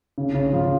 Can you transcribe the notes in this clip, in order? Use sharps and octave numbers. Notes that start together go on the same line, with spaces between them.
C#3
C#3
F3